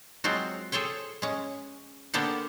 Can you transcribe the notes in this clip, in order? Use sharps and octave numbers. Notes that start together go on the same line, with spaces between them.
F#3 G#3 C4 F4 F#4
G#4 A4 C5 C#5 G5
G#3 C#4
D3 A#3 B3 D4 G4 F#5